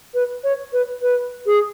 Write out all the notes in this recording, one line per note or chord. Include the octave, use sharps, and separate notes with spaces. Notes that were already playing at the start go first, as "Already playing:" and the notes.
B4
C#5
B4
B4
G#4